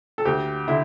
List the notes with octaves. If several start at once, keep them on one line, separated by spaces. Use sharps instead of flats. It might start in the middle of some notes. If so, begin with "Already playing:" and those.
A4
D2 G4
D3 E4